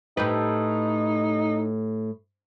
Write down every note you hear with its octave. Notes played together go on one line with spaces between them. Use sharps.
A2 D#4 G4 B4